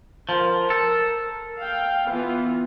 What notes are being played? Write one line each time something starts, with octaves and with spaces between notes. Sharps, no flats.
F3 A#4
A4
F5 G5
E3 B3 F4